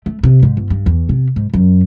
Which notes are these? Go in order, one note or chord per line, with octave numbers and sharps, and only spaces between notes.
A3
C3
G#2
G1
G2
E2
C3
G#2
F#2